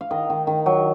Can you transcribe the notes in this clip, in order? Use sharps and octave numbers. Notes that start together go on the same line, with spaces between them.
F5
D#3 D#5
D#3
D#3
F#3